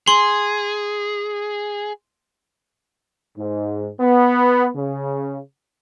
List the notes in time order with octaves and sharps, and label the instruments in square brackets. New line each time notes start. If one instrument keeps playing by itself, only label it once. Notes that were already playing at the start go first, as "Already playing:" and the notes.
[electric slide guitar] G#4 [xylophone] C6 F#7
[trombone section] G#2
B3
C#3